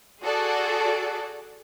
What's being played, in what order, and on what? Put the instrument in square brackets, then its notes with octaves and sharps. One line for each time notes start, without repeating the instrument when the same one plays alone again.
[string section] F#4 G#4 A4 D5 F#5